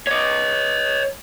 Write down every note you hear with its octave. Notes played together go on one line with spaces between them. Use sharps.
C#5 D#5